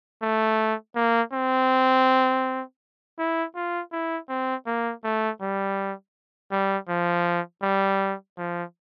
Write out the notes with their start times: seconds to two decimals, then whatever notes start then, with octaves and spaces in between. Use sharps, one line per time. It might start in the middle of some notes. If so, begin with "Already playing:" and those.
0.22 A3
0.96 A#3
1.33 C4
3.19 E4
3.56 F4
3.92 E4
4.29 C4
4.67 A#3
5.04 A3
5.42 G3
6.52 G3
6.89 F3
7.63 G3
8.38 F3